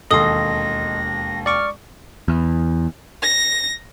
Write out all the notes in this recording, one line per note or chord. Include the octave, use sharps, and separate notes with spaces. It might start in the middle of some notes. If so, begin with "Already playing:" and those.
E1 D#2 A4 D#5 C6 D#6 A#6
D5 C#6 D6 F6
E2
A#6